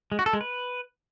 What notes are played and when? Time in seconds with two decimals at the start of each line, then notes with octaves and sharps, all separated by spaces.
0.12 G#3
0.19 F#4
0.26 A4
0.33 G#3
0.41 B4